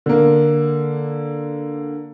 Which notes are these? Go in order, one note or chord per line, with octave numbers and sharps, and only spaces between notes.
D3 A#3